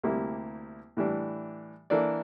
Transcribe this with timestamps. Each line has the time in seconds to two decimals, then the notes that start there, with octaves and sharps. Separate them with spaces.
0.03 D2 C3 G3 A#3 E4
0.97 A2 E3 G3 D4
1.90 E3 A#3 D4 A4 D5